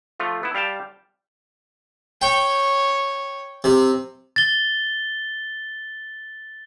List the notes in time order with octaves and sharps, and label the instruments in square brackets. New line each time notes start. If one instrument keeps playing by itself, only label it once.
[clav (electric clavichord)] F3 A3 F4
B3 E4
G3 F5 G5 A5
[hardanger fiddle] C#5 [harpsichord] G5
[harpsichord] C3
[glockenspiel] A6 G7